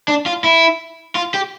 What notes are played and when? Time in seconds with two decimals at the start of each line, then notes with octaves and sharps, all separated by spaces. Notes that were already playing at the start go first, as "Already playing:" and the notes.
0.08 D4
0.26 F4
0.44 E4
1.15 F4
1.34 G4